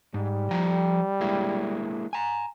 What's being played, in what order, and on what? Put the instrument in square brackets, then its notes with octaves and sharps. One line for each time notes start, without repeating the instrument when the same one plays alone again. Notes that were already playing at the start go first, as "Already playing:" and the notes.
[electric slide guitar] G#2 [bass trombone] G3
[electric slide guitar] F3 G5 A#5
G#3 A#3 E4
G#5 A#5